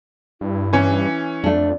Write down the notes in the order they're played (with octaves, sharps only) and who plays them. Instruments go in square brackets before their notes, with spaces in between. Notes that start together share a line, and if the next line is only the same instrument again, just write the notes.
[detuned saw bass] G2 [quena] E4
[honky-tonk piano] E3 C#4
[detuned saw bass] F2 [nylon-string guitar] A3 D4 [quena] D5